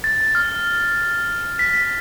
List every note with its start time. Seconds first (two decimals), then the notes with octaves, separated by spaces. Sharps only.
0.04 A6
0.35 F6
1.59 B6